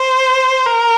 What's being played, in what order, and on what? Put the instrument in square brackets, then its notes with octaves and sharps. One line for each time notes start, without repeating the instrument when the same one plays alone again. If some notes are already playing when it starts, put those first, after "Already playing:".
Already playing: [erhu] C5
A#4